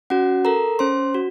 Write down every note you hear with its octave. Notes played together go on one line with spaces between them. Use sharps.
C#4 F#4 F#5
A4 A#4 A#5
C#4 C5 C6
F#4